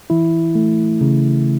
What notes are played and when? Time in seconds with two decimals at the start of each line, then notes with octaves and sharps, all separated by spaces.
0.10 E3 E4
0.55 A3
1.01 C#3